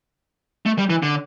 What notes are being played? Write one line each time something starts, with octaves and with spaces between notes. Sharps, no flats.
A3
G3
E3
D3